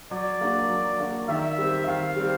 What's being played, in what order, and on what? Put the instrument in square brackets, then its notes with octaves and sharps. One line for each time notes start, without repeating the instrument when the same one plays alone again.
[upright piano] F#3 [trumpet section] D5
[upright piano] A#3 D4 F#4
F#3
A#3 D4 F#4
[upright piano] D#3 [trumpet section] E5
[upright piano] G3 C4
[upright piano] D#3 [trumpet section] F5
[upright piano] G3 C4